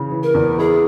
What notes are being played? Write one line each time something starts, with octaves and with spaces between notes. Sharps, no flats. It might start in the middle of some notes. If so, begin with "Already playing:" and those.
Already playing: C#3 E3
E3
A#4
E2
E4 G#4